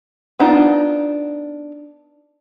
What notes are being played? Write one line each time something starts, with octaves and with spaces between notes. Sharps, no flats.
B3 D4 D#4 F4